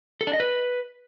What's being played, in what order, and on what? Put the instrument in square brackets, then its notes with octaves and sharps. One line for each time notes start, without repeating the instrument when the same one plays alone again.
[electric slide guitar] A4
D4
D#5
B4